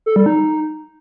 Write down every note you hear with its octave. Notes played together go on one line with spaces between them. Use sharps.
A4
G3
D#4